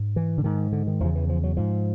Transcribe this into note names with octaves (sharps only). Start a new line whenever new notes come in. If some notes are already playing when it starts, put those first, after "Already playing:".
Already playing: G#2
E3
D3
G#2 D#3
D3
D#3
E2 C#3 F3
E3
F3
F#3
G#2 F3